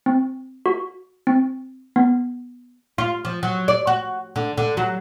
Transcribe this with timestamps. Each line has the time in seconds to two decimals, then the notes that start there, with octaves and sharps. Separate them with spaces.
0.06 C4
0.66 F#4
1.27 C4
1.96 B3
2.98 F4
3.25 F3
3.43 F#3
3.68 D5
3.87 F#4
4.36 D3
4.58 D3
4.77 F#3